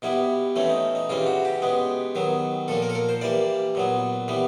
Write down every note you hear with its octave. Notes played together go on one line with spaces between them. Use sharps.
B2 G3 B3 E4
E3 A3 C4 C#4
D#4
D#4
C#3 E3 G3 C4 F4
F#4
G4
B2 G#3 B3
D#3 F#3 B3
A#2 F3 A#3 A4
A#4
A4
A#4
C5
E3 G3 A#3 D5
A#2 F#3 B3
E3 G3 B3